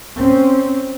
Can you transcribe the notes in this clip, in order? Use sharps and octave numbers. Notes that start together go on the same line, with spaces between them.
C4 C#4